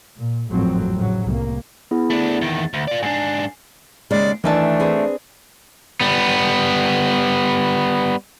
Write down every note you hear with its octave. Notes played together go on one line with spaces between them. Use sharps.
A#2
G#1 F2 A2 F3 F#3 C4
A2 C#3 F#3
C2 A#3
B3 E4 G#4
A3 D4
E2 D#3 A6
D2
F4 D5
G#2 D4 G#5 C7
D#2 C#3 G#3 D5
D#3 E3 A3 D4 E5 A5
C4 G#4 B4
G3 B3